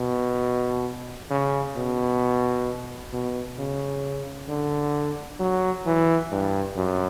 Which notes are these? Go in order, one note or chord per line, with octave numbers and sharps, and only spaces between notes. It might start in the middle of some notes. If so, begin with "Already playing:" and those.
Already playing: B2
C#3
B2
B2
C#3
D3
F#3
E3
G2
F#2